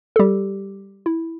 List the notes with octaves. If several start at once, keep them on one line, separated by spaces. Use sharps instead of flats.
A4
G3 G4
E4